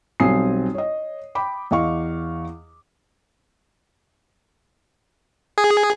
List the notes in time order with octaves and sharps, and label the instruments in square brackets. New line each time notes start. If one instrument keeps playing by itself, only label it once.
[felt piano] B1 G3 C4 G#5 D#6 C7
C#5 D#5
G5 B5 D6
E2 D#5 F5 C#6
[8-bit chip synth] G#4